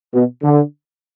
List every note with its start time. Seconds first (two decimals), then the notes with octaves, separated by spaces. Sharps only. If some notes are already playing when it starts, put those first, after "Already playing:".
0.14 B2
0.43 D3